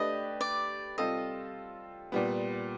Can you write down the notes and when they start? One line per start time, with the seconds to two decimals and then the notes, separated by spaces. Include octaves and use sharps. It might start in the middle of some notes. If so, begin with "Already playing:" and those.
Already playing: A3 D4 G4 B4 D#5
0.41 D5
0.98 G3 C4 F4 A4 D#5
2.12 A#2 G3 B3